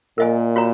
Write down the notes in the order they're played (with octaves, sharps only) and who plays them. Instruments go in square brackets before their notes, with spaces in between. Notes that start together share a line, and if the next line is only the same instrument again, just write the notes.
[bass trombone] A#2 [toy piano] A#4 D#5 G#5
[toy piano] F#4 C#5 A#5